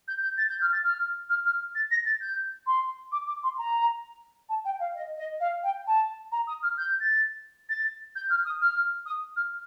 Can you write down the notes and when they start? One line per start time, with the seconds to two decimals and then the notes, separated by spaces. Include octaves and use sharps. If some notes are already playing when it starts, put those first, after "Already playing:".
0.08 G6
0.22 G6
0.38 A6
0.50 G6
0.61 F6
0.73 A6
0.84 F6
1.30 F6
1.45 F6
1.75 A6
1.91 A#6
2.05 A6
2.21 G6
2.66 C6
3.12 D6
3.28 D6
3.43 C6
3.58 A#5
4.49 A5
4.65 G5
4.80 F5
4.95 D#5
5.18 D#5
5.40 F5
5.63 G5
5.87 A5
6.32 A#5
6.47 D#6
6.63 F6
6.78 G6
7.00 A6
7.69 A6
8.16 G6
8.30 F6
8.45 D#6
8.61 F6
9.06 D#6
9.36 F6